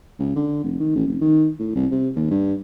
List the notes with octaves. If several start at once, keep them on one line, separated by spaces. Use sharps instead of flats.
C#2
D3
F1
D#3
A1
F1
D#3
A2
C2
C3
D#2
G2